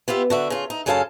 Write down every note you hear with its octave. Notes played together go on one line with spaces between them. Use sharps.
B3 F4 G4 E5
D3 F#4 E5
C#3 F4
D#4
F#2 C#3 C#4 A4 F5 A5